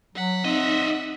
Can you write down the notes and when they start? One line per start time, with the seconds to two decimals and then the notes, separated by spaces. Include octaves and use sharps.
0.15 F#3 F#5 B6
0.45 C4 D#4 D#5 E5